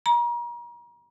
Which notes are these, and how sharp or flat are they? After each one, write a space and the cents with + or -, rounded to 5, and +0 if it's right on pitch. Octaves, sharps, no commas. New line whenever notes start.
A#5 +35